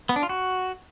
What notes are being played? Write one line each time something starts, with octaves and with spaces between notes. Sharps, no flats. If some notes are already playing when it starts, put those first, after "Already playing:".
B3
D4
F4
F#4